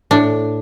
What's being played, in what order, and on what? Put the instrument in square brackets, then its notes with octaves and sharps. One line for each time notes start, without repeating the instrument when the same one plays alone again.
[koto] A2 D4